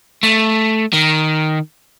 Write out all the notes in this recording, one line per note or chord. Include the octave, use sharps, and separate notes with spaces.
A3
D#3